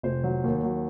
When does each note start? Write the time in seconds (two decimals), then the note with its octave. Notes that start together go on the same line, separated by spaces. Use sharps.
0.03 F1 C5
0.24 F#3
0.44 D#2
0.63 F#3